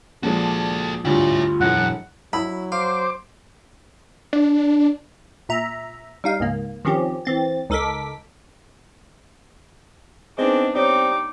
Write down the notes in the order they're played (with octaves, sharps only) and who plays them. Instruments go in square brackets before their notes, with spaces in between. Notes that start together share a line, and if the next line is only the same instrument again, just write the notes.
[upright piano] A#2 F3 G#3 [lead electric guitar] F#4 A4
[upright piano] D2 G2 [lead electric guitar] E4 C#5 [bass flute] F4
[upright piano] E1 E3 [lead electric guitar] F#2 [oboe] F#5
[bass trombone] F#3 [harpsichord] E4 [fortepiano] B5
[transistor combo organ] C5 D6 [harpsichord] F5
[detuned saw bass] D4
[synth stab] A#2 E5 A#5
G3 D#4 F5
C#2 G#2 A#3
D#3 F3 C4 C#4 G4
E3 C4 A6
C#2 D#4 A4 A#4 D6 B6
[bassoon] G#3 [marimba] B3 D#4 B4 [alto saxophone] C4 [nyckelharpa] D4
[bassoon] G3 [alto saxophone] C4 [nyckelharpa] D#4 D6 [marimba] C#5